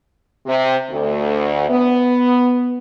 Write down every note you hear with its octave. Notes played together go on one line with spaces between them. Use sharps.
C3
D2
B3